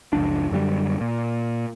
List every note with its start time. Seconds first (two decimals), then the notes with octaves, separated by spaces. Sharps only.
0.13 F#1 C#2 F3 D4
0.51 F#2 D3 F#3 G3
1.01 A#2